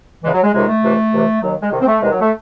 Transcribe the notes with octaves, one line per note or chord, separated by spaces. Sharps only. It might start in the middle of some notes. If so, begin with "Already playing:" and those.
E2 C#3 E3 G#3
F#3
G#3
C#2 C3 D#3 G#3
A3
C#2 C3 E3
C#2 C3 E3
D#2 D#3 F#3
G#3
C2 C3 D#3
C4
A3
E2 C3 D#3 G#3
F#3
A3